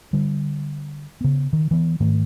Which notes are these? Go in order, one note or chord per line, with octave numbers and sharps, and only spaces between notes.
D3 G3
C#3 B3
D#3
E3 B3
G#2 D#3 A3